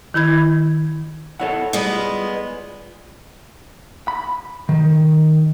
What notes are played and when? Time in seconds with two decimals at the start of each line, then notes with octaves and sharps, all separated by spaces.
0.14 D#3 E4 B5 G#6
1.40 E4 A4 C#5 F#5
1.73 G3 G#3 B3 D5 B5
1.92 F4
4.08 B5
4.69 D#3